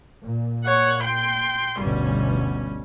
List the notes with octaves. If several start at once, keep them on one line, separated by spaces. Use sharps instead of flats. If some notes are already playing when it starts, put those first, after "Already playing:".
A#2
C#5 F#5
G5 C6
G1 D2 B2 G3 C#4